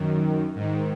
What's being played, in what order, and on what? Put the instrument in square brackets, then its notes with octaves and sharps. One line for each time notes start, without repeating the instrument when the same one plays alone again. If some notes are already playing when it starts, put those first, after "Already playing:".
Already playing: [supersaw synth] F#2 D#3
G#2 D#3